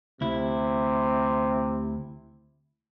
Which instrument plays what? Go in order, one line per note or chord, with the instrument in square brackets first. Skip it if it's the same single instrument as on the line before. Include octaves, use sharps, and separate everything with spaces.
[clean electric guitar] D2 E4 [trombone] C3